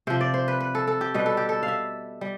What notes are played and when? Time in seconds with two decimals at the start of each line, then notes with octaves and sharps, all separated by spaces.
0.07 C3 F3 C5
0.21 D5
0.34 C5
0.48 B4
0.60 B4
0.75 A4
0.87 A4
1.01 G4
1.14 B2 G3 B4
1.26 A4
1.37 G4
1.49 A4
1.63 F5
1.68 E5
2.21 G3